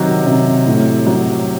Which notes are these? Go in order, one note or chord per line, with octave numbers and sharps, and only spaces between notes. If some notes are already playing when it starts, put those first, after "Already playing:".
Already playing: C3 D#3 F#3
C3
A2
F#3